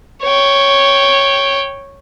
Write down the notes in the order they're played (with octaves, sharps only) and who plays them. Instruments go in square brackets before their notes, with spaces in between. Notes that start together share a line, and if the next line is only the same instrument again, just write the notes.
[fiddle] C#5 G5